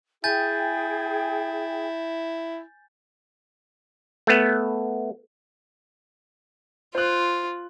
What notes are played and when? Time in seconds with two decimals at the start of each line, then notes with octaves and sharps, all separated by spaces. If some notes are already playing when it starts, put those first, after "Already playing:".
0.24 E4 G#4 G5 G#5 G6 A6
4.27 A3 B3
6.95 F4 C5 F#6